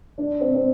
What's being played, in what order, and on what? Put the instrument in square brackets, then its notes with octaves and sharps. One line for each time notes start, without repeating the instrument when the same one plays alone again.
[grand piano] D4
C4
C4